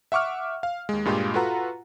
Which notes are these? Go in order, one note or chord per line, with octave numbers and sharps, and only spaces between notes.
E5 F#5 C#6 D6 F6
F5
D#2 G#3
G2 A#2 G#3 F4 G4
F4 F#4 A4 B4 F#5 A#5